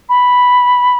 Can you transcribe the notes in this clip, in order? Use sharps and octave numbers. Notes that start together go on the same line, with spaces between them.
B5